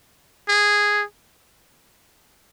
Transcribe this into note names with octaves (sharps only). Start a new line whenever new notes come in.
G#4